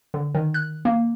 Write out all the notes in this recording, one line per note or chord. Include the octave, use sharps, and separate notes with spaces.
D3
D#3
F#6
A#3